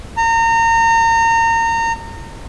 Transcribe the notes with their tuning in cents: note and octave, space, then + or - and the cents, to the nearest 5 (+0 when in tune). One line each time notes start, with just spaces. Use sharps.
A#5 -30